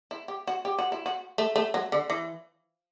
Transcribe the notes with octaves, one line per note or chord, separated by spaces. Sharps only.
E4
G4
F#4
G4
F#4
E4
F#4
A3
A3
F#3
D3
E3